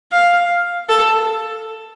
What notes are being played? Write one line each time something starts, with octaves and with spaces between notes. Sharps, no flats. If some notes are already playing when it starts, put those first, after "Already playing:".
F5
A4